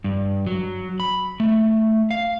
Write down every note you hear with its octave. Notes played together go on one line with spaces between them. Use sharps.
G2
F#3
B5
A3
F5